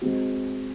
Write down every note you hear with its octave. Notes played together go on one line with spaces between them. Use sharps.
G#3 C4 F#4